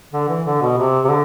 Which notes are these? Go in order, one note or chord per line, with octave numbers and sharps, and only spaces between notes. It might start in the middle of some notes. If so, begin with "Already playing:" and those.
D3
E3
D3
B2
C3
C3
D3